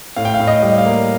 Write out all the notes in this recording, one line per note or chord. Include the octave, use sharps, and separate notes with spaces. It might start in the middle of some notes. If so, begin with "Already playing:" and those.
A2 F5
G5
F5
A2
D#5
G3
F5
A#3